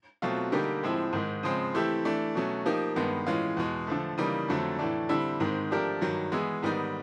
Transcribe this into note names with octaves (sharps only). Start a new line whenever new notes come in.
B2 F#3 A3 C4 F4
D3 G3 A#3 D#4 G4
A2 F3 G#3 C4 E4
G#2 D#3 G#3
C#3 F3 G#3 C4
E3 A3 C4 E4 G4
E3 A3 D4
B2 F#3 A3 C#4
F3 A#3 D#4 G4
G2 D#3 G#3 B3
A2 E3 G#3 C#4 F4
E2 B2 G#3
D3 F3 A3
C#3 E3 G3 A#3 D#4
F2 D3 F#3 A3 C4
A2 E3 A3 D4
D3 G3 C4 E4
G#2 D#3 G#3 C4
F3 A3 D4 G4 A#4
G2 D#3 F#3
E3 G#3 B3 E4 G#4
G#2 D#3 G3 B3 D#4